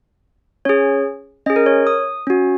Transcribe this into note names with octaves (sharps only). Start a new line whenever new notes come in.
C#4 G#4 C#5
C#4 G#4 D#5
A#4
C#5
D#6
C#4 F#4